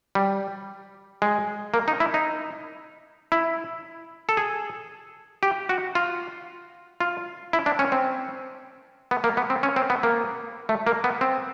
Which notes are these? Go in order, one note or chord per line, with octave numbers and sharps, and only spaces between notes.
G3
G#3
A#3
D#4
E4
D#4
E4
A4
G#4
G4
F#4
F4
F4
E4
D4
C#4
C4
B3
A#3
B3
C4
C#4
C4
B3
A#3
A3
A#3
B3
C4